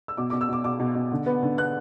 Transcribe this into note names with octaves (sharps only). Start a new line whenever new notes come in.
E6
B2 D6
D6
B2
E6
B2 D6
B2 D6
B2
B2
D3
B3
D3
B3 F#6